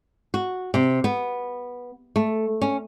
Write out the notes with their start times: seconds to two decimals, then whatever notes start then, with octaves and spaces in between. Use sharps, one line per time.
0.34 F#4
0.74 C3
1.04 B3
2.16 A3
2.62 C#4